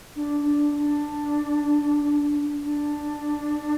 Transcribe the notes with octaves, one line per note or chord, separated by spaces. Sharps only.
D4
D4
D4
D4